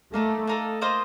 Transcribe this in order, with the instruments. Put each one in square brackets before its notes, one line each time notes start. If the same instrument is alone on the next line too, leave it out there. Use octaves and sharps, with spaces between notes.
[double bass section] A3 [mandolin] A#3 D#4 A4
[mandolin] A#3 D#4 A4
A#3 F4 C5 D#5